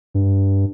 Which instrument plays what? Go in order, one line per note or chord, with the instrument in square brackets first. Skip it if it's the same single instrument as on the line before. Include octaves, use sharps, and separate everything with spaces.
[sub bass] G2